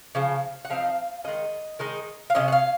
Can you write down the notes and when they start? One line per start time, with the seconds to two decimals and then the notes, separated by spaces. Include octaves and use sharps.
0.15 C#3 F3
0.65 F#5
0.70 F3 C4 D#4 F5
1.24 D#3 G#3 C#4 D#5
1.79 D#3 G#3 D#4
2.30 F5
2.35 C3 F#3 C#4 D#5
2.48 F#5
2.52 F5